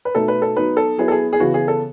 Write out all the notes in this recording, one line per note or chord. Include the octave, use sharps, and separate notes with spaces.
B4
B2 A3 D#4 A4
B4
A4
F#3 B3 D#4 B4
A4
F#3 B3 E4 G#4
A4
G#4
G#4
C#3 E3 B3 F#4
G#4
A4